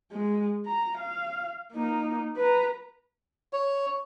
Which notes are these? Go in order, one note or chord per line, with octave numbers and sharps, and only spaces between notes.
G#3
A#5
F5
A#3 D#4
B4 A#5
C#5